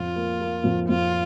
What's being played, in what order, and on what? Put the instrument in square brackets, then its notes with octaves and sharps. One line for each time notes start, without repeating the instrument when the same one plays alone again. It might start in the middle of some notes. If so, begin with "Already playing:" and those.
Already playing: [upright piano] F2 [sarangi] F4
[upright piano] A#3
A#3
F2
[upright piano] F2 [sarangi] F4